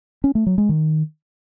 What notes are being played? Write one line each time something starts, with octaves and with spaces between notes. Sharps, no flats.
C#4
A3
F#3
G#3
D#3